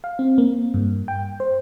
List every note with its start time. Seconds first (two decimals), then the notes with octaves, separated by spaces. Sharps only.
0.04 F5
0.19 C4
0.38 A#3
0.74 G2
1.08 G5
1.40 C5